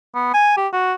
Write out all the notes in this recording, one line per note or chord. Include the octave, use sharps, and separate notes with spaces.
B3
G#5
G4
F#4